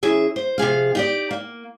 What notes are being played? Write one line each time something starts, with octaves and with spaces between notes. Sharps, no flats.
E3 C#4 G#4 E5
C5
C3 F3 G#4 F5
D#4 G4 D5
A#3